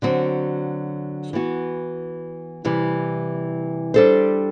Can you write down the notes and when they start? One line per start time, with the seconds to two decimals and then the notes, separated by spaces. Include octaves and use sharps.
0.02 D3 F#3 C4 F#4
1.33 E3 B3 F#4
2.65 C3 E3 G3
3.94 G3 D4 A4 C5